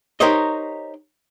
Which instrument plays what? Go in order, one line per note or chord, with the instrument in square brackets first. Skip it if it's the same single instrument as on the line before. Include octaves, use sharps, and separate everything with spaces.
[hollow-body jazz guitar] D#4 G4 A#4 C5 C#5 D#5